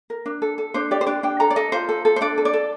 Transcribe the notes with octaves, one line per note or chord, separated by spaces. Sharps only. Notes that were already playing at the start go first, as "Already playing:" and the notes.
A#4
D4
A4
A4
D4 C5
G4 D5
C5
D4 D5
D4 G5
A4 A#5
D5
A4 D#5
F4 C5
A4
A4
C5
D4 D5
A4
D5
A4